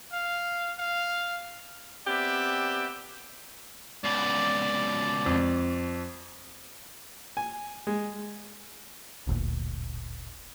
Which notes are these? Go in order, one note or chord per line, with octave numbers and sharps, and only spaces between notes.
F5
F5
B3 C4 G4 D5 E5
C#2 B2 D5
F2
G#5
G#3
D1 G1 D2 A#2